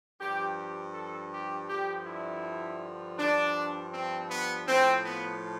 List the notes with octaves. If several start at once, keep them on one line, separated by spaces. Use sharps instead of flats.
G2 F3 G4
G4
A4
G4
G2 D3 F3 G4
E4
G2 F3 D4
C4
B3
A2 F3 C4
B3